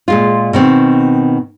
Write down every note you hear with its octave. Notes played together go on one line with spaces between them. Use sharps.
A#2 G#3 F4
B2 D#3 C4